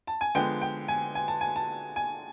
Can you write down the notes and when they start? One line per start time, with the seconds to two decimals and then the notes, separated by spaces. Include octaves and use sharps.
0.07 A5
0.21 G#5
0.35 D3 F3 G#3 B3 G5
0.61 G5
0.88 G#5
1.15 G#5
1.28 A5
1.41 G#5
1.56 A5
1.96 G#5